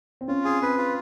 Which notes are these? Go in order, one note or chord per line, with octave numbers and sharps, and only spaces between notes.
C4
C#4 F4
C4 G#4
C4 B4
F4